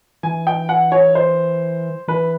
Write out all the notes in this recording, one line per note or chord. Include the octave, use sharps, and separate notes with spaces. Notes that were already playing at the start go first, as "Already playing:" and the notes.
E3 G#5
G5
F#5
C#5
C5
E3 B4